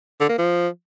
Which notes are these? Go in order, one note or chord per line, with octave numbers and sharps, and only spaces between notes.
D3
A#3
F3